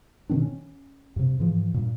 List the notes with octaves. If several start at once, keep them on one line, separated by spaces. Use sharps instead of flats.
B2 D#3 C4 D4
C#4
G2 C3
G#2 E3 F3
G2 A#2